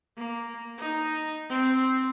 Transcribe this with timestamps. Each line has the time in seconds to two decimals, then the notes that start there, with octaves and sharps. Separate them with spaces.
0.18 A#3
0.79 D#4
1.50 C4